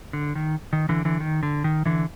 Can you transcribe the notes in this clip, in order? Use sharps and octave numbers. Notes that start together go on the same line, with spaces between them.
D3
D#3
D#3
D3 E3
D3 E3
D#3
D3
D#3
D3 E3